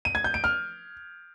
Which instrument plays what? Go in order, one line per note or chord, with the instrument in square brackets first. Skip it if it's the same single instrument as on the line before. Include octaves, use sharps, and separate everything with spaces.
[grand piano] D#7
G#6
G6
D7
F6